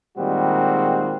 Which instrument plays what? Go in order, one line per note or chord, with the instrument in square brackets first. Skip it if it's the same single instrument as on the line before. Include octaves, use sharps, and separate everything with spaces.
[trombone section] A#2 D#3 G3 G#3 C4 F#4